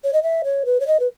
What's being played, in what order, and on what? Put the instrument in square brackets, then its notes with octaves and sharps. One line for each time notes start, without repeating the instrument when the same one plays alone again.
[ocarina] C#5
D#5
E5
C#5
B4
C#5
D#5
B4